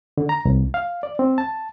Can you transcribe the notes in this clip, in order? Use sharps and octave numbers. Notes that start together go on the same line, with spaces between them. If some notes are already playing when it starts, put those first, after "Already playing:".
D3
A#5
C2
F5
D5
C4
A5